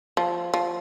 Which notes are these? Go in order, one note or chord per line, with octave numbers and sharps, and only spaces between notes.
F3
F3